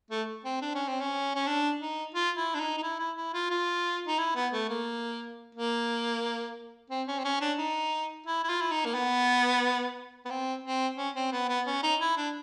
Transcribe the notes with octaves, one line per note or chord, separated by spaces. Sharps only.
A3
C4
D4
C#4
C4
C#4
C#4
D4
D#4
F4
E4
D4
D#4
D#4
E4
E4
E4
F4
F4
D#4
E4
B3
A3
A#3
A#3
C4
C#4
C4
C#4
D4
D#4
E4
E4
F4
E4
D#4
A#3
B3
B3
C4
C4
C#4
C4
B3
B3
C#4
D#4
E4
D4